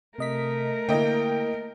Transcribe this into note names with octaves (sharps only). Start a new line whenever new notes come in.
C3 A3 A#4 D#5 B6
D3 A#3 E4 D#5 G5